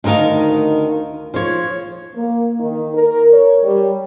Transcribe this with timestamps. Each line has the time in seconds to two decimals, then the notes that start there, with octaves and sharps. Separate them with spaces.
0.04 D2 D#3 D#4 A#4 F5
1.34 F3 C#5
2.15 A#3
2.60 D#3
2.94 A#4
3.31 C#5
3.64 G3